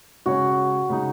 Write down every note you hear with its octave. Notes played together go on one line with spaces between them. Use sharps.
C#3 G#3 C#4 F#4 G#4 C#5
C#3 G#3 D#4